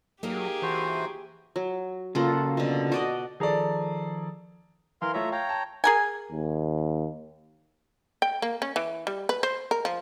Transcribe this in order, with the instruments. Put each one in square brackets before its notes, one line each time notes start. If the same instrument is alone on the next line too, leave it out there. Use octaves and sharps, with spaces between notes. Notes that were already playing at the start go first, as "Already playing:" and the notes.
[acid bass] F#3 [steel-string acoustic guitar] A#3 D#4 A#4 [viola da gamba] G4 G#4
[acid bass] E3 [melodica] F#4 C5
[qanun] F#3
[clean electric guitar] C#3 A#3 [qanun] F4 A4 F#5
[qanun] B2 D3
F#4 D5 D#5
[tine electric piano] D#3 F3 A#5 [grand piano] G#4 A4 D5
[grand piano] E3 [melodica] A#4 F5 C6
[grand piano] A3 F4 C#5 [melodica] E5 A#5
[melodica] C#5 G5 A#5 [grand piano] F5
[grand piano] A5
[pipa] G#4 A#4 G#5
[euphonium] D#2
[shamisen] G5
A#3
C#4
E3
G3
B4
C5
A#4
F3